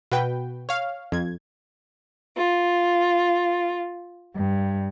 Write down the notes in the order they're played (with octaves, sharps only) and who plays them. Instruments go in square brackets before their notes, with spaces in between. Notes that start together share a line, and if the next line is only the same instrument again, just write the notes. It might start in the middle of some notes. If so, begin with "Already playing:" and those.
[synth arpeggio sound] B2 F#4 B4 G5
C#5 F5
F2 G#6
[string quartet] F4
G2